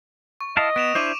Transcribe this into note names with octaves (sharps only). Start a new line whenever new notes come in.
C#6
E4 D#5 F5 A5
B3 D7 E7 F7
D4 E4 C5 D6 D#7